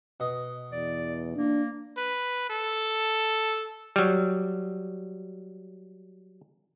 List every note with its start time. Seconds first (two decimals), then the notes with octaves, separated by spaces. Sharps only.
0.20 B2 D#5
0.72 E2 D5
1.36 A#3 D4
1.97 B4
2.50 A4
3.96 F#3 G3